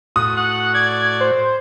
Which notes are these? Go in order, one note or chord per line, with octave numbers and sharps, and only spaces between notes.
A2 F#4 D#6
F#5
D5 G#6
C5